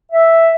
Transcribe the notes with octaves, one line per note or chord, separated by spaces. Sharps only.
E5